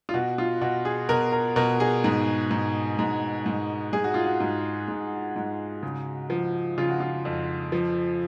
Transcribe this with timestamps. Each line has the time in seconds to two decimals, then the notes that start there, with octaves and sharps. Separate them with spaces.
0.09 F4
0.14 B2 F#4
0.38 F4
0.61 B2 F#4
0.85 G#4
1.09 B2 A#4
1.32 A#4
1.56 B2 A#4
1.80 G#4
2.04 G#2
2.51 G#2
2.99 G#2
3.46 G#2
3.93 G#2 G#4
4.04 F#4
4.14 F4
4.26 F#4
4.40 G#2
4.88 G#2
5.36 G#2
5.83 C#3
6.30 F3
6.78 C#3 F4
6.90 F#4
7.00 F4
7.25 F2
7.72 F3